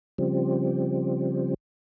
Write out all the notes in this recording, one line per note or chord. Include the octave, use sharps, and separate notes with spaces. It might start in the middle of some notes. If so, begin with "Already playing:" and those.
C#3 F3 G3 C4